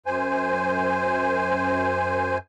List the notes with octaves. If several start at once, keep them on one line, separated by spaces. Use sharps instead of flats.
F#2 C5 G#5